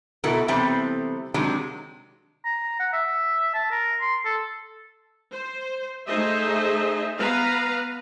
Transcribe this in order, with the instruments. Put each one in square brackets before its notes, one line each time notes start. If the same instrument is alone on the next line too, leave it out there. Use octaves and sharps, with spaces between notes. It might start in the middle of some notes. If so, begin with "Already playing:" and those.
[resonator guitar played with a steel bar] B2 A3 E4 F#4 A4 A#4
C3 E3 G3 A3 B3 C4
C3 D#3 F#3 G#3 D4
[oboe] A#5
F#5
E5
A5
A#4
C6
A4
[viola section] C5
A3 D#4 G#4 C5 D#5 E5
B3 B4 F5 A#5